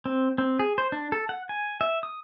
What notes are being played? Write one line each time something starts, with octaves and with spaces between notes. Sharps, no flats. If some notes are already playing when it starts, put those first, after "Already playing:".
C4
C4
G#4
C5
D4
A4
F#5
G#5
E5
D#6